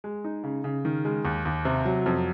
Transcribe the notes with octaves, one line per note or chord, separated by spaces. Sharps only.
G#3
D#4
C#3
C#3
D#3
G#3
D#2
D#2
C3
F#3
F2